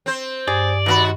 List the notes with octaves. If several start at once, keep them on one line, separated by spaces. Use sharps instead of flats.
C4 C5
G2 G#4 D5
D#2 B2 C4 F#4 B5